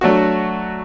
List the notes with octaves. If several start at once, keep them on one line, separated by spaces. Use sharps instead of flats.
F#3 A3 D4 F#4